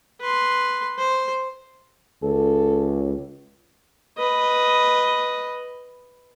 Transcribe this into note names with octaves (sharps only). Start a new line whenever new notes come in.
B4 C6
C5
C#2 A4
B4 D#5